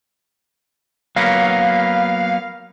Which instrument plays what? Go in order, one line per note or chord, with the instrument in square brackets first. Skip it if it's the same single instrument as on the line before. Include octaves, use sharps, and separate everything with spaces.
[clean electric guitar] F#3 A#3 B3 [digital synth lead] F5